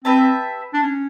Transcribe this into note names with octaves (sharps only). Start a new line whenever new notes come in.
C4 G4 B4 E5 A5
D4
C#4